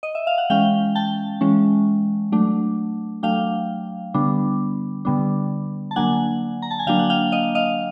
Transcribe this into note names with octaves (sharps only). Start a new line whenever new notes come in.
D#5
E5
F5
F#5
E3 G#3 C#4 F5 G5
G5 A5
E3 G#3 C#4
F#3 A3 D4
F#3 A3 D4 F5 G5
D3 G3 B3 D4
D3 G3 B3 D4
A5
D3 F#3 A#3 D4 F#5 G#5
A#5
A5
G#5
D3 F#3 A#3 D4 F5 G5
F#5
F5 G5
D#5 F5
D#5 F5